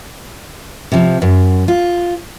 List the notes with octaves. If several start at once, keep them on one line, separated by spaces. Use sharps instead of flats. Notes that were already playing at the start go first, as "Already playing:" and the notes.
C3 F3
F#2
F4